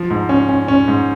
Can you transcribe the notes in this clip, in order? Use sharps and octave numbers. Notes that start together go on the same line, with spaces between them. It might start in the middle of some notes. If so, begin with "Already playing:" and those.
Already playing: F3
G#2
C#4
C#4
C#4
G#2